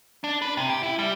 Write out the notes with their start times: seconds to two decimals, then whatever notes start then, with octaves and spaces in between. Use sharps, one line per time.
0.24 D4
0.42 B4
0.57 C3
0.69 G4
0.83 E4
0.99 G3